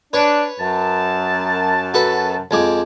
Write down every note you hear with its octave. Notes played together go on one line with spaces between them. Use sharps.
D4 B4 C#5
F#2 A5
F#4 A4 B4
F2 G#3 D6